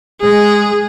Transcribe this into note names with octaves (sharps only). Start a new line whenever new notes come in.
G#3 G#4